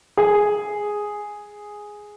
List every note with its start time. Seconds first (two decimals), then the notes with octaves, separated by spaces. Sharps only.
0.17 G#4